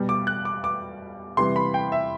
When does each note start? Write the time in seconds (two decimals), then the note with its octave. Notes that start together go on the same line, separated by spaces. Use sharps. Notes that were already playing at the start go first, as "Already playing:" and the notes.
Already playing: B2 G3
0.09 D6
0.27 F#6
0.45 D6
0.64 D6
1.37 C3 E3 G3 C6
1.56 B5
1.74 G5
1.92 E5